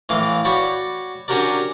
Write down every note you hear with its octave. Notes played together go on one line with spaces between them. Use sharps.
A2 E3 F5 D6
F#4 C#5 D5 G5 B5
C#4 D4 F#4 G4 A#4 D5